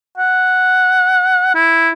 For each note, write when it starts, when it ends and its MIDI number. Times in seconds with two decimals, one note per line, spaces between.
0.17 1.55 78
1.55 1.90 64